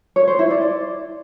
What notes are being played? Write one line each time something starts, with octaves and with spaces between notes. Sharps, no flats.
C#5
C5
E4
D5
D5